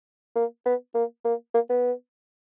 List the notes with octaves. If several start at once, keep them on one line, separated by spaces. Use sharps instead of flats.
A#3
B3
A#3
A#3
A#3
B3